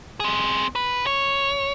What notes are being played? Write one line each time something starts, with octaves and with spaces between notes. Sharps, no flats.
C4 G#4
B4
C#5